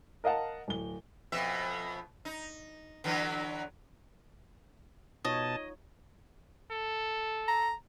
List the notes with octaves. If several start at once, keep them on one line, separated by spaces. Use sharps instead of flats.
A#4 D#5 F5 F#5 A5
D1 G7
F2 B2 E5
D#4
D3 E3 F#3
B2 D#4 F4 C#5 D#5 A5
A4
A#5